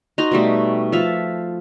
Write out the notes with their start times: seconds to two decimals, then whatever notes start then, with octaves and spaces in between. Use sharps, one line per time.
0.18 D#4 F#4 A#5 C6
0.32 B2 G3 A3
0.92 F3 A4 E5 F5